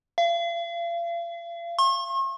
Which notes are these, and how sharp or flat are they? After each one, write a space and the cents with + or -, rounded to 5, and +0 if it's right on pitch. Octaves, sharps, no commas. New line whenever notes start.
F5 -40
C#6 -45